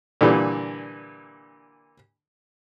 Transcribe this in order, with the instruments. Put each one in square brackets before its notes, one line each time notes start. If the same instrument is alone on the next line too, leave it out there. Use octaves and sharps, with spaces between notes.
[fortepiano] A#2 D3 E3 G3